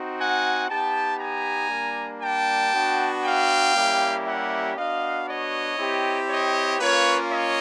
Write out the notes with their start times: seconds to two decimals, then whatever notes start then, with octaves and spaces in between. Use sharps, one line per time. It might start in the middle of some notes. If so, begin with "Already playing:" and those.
Already playing: C4 D#4 F#4
0.17 F#5 G#5
0.68 B3 D#4 G4 G5 A5
1.19 G#5 A#5
1.70 G3 A#3 D4
2.21 G5 A5
2.72 B3 D4 F#4
3.23 F5 G5
3.74 G3 A#3 C#4 E4 G4
4.25 E5 F#5
4.76 B3 D4 F#4 D#5 F5
5.27 C#5 D#5
5.77 C4 E4 G4
6.29 C#5 D#5
6.79 A#3 C#4 F4 B4 C#5
7.30 C#5 D#5